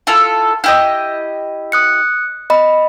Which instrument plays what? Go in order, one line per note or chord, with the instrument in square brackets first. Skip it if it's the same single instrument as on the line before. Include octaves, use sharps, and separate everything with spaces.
[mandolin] E4 F4 A4
E4 G4 D#5
[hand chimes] D#6 F#6 C#7
D#5 B5